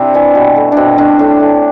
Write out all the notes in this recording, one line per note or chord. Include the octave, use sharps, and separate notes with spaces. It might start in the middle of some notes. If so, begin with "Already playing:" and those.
Already playing: C3 C4 D4 E4
E3 G3
B2
A3
B2 C4 D4
A3 D4
A2 D4
E3 A3